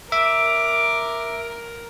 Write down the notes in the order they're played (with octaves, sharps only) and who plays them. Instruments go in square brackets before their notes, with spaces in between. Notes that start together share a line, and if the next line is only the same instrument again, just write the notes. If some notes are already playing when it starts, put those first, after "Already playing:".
[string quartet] A#4 [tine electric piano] E5 [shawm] D6